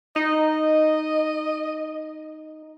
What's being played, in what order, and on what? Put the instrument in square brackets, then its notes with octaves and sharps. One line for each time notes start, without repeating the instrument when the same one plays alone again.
[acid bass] D#4 [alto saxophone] D#5